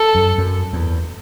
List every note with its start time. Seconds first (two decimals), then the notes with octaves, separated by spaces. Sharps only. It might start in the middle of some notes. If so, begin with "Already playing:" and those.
Already playing: A4
0.15 F#2
0.38 F#2
0.73 E2